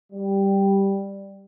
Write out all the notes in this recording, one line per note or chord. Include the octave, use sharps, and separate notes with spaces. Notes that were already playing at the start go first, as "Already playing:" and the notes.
G3